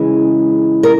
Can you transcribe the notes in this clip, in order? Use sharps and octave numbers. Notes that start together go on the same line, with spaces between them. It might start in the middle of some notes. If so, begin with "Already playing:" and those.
Already playing: C#3 E3 G#3
A#4